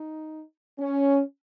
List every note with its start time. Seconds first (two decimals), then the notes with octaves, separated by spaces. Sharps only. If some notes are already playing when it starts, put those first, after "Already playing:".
Already playing: D#4
0.79 C#4